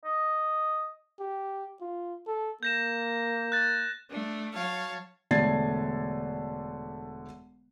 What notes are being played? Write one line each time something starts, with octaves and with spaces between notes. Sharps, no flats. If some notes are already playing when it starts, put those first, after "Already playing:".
D#5
G4
F4
A4
A#3 G6 A#6 E7
F#6 A6
A3 D4
F#3 C#5 F5 A5
E1 D3 A3 G#6 A6 C7